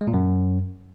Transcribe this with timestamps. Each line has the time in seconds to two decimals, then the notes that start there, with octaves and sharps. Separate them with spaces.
0.01 G#3
0.07 A#2
0.14 F#2